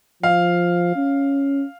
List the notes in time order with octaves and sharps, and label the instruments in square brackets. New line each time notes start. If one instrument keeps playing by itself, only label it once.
[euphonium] F3 [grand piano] F5
[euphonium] C#4